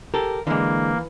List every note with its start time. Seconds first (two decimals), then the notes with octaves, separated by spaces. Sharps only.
0.14 G4 A4 A#4
0.47 D3 E3 G#3 A#3